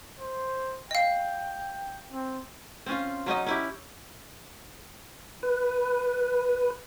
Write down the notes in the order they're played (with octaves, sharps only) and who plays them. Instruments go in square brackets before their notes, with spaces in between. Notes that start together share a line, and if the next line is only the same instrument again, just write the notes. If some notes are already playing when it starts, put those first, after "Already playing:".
[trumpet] C5
[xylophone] D#5 F5 [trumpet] G5
[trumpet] C4
[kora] C4 C#4 F4
F#3 C#4 D#4 D#5
C#4 E4 G4
[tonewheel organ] B4